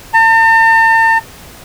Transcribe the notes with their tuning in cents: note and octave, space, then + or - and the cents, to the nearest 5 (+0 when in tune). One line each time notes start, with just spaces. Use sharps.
A5 +45